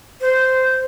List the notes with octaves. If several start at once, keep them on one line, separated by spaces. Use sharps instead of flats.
C5